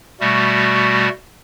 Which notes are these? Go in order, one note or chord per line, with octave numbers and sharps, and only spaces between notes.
B2 G3 A3 F#4